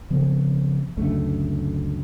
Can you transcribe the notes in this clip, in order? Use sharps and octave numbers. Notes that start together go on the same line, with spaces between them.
C#3 F3 B3 C4
C#2 F#2 D3 A3